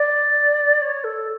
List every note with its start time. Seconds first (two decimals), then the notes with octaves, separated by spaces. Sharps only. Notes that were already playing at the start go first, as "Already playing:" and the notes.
Already playing: D5
0.81 C#5
1.03 A4